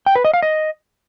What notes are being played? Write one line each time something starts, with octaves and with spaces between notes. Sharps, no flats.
G5
B4
D#5
F5
D#5